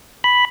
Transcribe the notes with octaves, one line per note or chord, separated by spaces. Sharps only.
B5